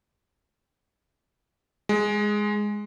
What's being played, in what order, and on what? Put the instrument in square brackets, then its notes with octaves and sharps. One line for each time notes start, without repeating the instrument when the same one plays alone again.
[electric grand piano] G#3